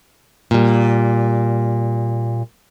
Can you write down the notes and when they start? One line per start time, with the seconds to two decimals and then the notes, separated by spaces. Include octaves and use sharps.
0.51 A#2 G3